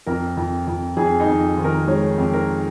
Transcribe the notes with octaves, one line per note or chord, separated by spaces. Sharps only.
F2 A#4
F2
F2
F2 G#4
D#4
F2
D#3
A#4
G#3 C#5
F2
A#4